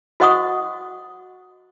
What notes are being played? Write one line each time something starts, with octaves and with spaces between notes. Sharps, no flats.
F#4 C5 D#5 F#5 C#6 D#6